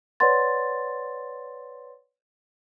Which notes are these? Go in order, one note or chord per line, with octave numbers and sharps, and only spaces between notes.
B4 C#5 D5 F#5 C6 A6